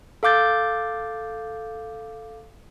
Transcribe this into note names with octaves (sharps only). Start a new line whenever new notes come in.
A4 F5 D6 G6 A6